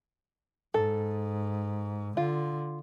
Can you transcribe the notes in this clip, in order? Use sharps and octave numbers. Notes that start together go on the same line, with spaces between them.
G#2 A4
D3 F4